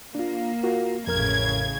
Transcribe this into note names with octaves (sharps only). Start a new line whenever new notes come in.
A#3 D4 F4
F4 F#4 A#4
A1 F2 C#3 A#4 F6 G#6